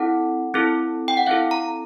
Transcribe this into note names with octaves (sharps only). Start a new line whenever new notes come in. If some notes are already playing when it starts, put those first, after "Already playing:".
Already playing: C4 E4 A4 F#5
C4 E4 A4
G5
F#5
C4 E4 A4 F5
A#5